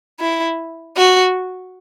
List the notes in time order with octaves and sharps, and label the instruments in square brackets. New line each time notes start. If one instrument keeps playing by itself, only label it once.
[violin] E4
F#4